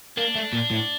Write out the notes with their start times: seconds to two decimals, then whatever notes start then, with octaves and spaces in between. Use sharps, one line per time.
0.17 A#3 D4
0.35 A3
0.53 A#2
0.71 A2